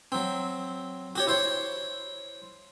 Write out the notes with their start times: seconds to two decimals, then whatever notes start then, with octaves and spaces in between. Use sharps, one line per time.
0.12 F#3 C4
1.16 F#4 G4 C#5
1.27 E4 C5 C#5